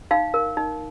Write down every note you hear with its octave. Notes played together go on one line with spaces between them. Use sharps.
D#4 F5
A#4
D#4